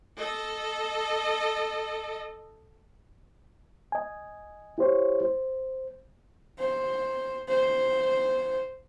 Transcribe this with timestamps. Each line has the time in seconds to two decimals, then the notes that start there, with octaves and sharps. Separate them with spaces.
0.17 A4 D#5
3.92 D#5 G#5
4.78 E4 G4 C5 C#5
5.21 C5
6.59 C5
7.49 C5